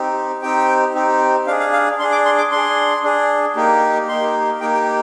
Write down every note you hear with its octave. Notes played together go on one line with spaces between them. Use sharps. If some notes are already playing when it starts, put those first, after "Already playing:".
Already playing: C4 D#4 G4
C4 D#4 G4 G5
C4 D#4 G4
D4 G#4 F5
F5
F5
D4 G#4 C6
D6
C6
D6
D4 G#4 C6
D4 G#4
A#3 D#4 G4
A#3 D#4 G4 C6
A#3 D#4 G4 G5
G5